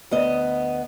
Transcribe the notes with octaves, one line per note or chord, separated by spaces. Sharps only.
D2 B3 D#5